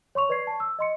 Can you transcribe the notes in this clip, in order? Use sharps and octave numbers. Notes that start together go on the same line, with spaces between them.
C#5 C6 C#6 F7
B4 D5 C#6 G#6 C7
A5
E6
D#5 C6 C#7